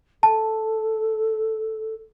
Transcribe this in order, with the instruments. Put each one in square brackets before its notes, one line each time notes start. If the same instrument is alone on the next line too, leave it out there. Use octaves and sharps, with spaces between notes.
[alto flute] A4 [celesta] A5